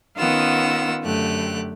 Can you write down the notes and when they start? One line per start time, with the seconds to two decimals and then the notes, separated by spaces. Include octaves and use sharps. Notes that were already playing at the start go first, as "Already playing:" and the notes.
0.17 D#3 B3 C#4 F4 F#5 E6
1.03 F#2 D3 A3 G4 F#6